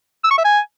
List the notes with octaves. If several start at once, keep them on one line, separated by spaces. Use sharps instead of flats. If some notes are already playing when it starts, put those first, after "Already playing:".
E6
C#6
E5
G#5